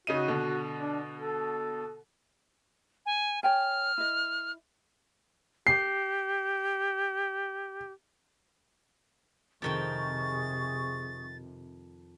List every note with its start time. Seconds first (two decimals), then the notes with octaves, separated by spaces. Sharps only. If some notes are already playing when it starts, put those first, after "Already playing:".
0.07 C#3 D#4 F#4 D#7
0.28 B2 D3
0.76 D4
1.16 A4
3.06 G#5
3.43 C#5 G5 G#5 F6
3.98 E4 D#5
5.67 G4 C7
9.62 F2 C3 D#3 G#4 G5 C#6 A6